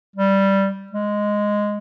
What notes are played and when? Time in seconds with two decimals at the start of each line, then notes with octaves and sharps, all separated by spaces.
0.16 G3
0.92 G#3